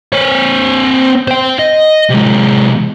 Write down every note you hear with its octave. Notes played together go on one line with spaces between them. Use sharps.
C4 C#5
C5 G5
D#5
C3 G#3